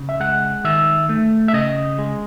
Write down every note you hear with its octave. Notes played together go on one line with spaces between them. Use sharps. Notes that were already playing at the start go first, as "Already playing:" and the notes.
Already playing: C#3
E5
G#3 F#5
D#3 E5
A3
E5
C#3 D#5
G#3